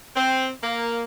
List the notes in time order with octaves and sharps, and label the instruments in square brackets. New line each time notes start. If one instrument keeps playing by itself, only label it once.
[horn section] C4
A#3